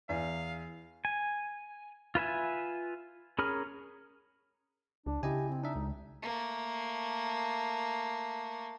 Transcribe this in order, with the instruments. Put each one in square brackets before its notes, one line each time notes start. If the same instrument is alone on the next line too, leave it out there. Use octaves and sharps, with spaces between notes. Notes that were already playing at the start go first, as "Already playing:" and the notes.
[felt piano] E2 [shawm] F5
[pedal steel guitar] G#5
F4 B4 E5 G#5
C#4 G#4 A#4 B5 F6
[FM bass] C#2 [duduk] D4
[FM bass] C#3 [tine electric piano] E4 D#5 G#5 [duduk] G4
[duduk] C4
[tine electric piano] D4 E5 [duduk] D#4
[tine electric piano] C#2
[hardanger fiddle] A3 A#3